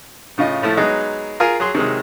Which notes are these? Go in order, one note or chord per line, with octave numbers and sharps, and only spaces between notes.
A2 C#3 F4 D#5
A2 F3 A3 E4
F#3 G#3 B3 D#4
F4 G#4 A#4 F5 G#5
F#3 G#4 C6
C3 D#3 F#3 G#3